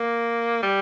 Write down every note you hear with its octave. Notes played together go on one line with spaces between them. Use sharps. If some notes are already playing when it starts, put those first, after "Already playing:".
Already playing: A#3
G3